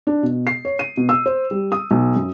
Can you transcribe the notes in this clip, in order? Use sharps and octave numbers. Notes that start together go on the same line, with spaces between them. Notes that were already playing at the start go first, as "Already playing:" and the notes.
D4
B2
C7
C#5
D#7
B2
E6
C5
G3
D#6
B1
F#2